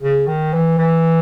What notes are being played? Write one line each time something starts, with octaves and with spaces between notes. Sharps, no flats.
C#3
D#3
E3
E3